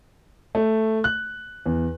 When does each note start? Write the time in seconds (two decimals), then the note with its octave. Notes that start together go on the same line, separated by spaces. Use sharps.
0.55 A3
1.04 F#6
1.66 E2